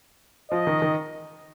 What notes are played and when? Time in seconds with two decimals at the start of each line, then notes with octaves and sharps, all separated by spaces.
0.51 F3 D#5
0.67 D#3
0.82 D#3